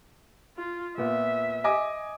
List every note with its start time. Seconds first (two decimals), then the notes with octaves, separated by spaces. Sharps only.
0.57 F4
0.98 A#2 B3 E5
1.64 D#5 G#5 D6